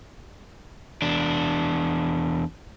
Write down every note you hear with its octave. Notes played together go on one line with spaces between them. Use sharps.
E2 D4